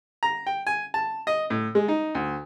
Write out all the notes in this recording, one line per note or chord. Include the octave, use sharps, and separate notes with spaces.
A#5
G5
G#5
A5
D#5
A2
G#3
D#4
D2